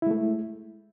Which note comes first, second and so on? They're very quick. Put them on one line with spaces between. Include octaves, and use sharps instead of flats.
E4 G#3 A3